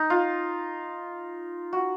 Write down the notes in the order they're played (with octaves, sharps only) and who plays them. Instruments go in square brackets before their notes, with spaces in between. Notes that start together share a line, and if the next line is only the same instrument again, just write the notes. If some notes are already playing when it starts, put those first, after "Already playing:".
Already playing: [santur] D#4
F4
F#4